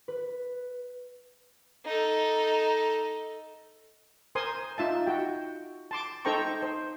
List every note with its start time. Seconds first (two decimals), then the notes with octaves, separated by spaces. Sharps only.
0.08 B4
1.85 D#4 A4
4.35 A#4 C5 G#5 C6 D#6
4.78 D#4 F4 E5 A5
5.06 F#4 G5
5.91 A5 C6 D6
6.25 D#4 A4 C5 G5 A#5 C#6
6.62 C5